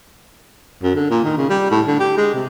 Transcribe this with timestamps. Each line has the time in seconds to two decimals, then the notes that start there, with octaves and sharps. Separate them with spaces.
0.83 F#2
0.95 D3
1.10 A#2
1.24 D#3
1.37 C#3
1.49 G3
1.71 A2
1.87 D3
2.00 G4
2.17 G#3
2.35 C3